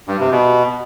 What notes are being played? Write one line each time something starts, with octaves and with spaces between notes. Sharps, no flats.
G2
C3
B2